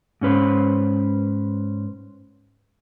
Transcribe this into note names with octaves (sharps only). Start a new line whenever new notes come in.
G#2 C#4 B4 C5